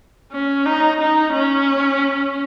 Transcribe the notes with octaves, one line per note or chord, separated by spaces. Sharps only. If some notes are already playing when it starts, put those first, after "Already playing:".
C#4
D#4
D#4
C#4